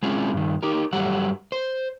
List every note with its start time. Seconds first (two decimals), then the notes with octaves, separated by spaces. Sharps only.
0.03 G#3 C4 C#4 E4 F4 G#4
0.34 G2 D#3
0.63 D#4 G4 A#4
0.93 G2 F#3 G3 A3 G4 F#5
1.52 C5